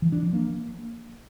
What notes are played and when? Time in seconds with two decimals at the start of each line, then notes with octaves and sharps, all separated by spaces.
0.02 E3
0.12 D4
0.23 F3
0.33 A#3